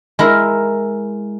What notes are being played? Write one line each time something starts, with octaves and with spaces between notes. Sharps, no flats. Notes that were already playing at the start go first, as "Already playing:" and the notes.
G#3 E4 A#4